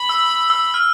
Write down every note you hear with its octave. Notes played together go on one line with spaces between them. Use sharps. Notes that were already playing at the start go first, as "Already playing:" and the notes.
Already playing: B5
E6
E6
F6